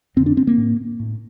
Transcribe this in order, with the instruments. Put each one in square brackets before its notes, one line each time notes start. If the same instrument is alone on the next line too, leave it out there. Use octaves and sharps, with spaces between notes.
[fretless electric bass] F2 C4
D3
D4
C4
A#3
A2
A2